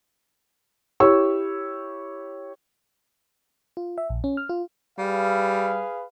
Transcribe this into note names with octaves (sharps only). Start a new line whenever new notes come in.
E4 G4 C#5 C#6 E6
F4
E5
A#1
C#4
F6
F4
G3 G#4 B4 F5